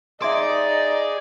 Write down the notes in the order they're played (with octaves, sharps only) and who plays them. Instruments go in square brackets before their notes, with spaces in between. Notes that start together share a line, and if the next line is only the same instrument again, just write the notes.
[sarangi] D#4 [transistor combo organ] G#4 [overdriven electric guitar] D5 [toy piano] E5 C6